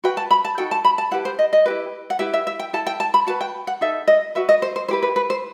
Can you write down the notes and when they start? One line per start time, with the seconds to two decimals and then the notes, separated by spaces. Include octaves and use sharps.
0.04 F#4 B4 G5
0.17 A5
0.31 B5
0.45 A5
0.58 D#4 F#4 A4 G5
0.71 A5
0.85 B5
0.98 A5
1.11 E4 G4 B4 F#5
1.25 C5
1.39 D#5
1.53 D#5
1.66 E4 G4 B4
2.10 F#5
2.19 E4 G4 B4 E5
2.34 E5
2.47 E5
2.59 G5
2.73 E4 A4 A5
2.86 G5
3.00 A5
3.14 B5
3.27 F#4 B4 A5
3.41 G5
3.67 F#5
3.81 D#4 A4 E5
4.07 D#5
4.35 F#4 B4 E5
4.49 D#5
4.62 C5
4.76 C5
4.88 E4 G4 B4 C5
5.02 B4
5.16 B4
5.30 C5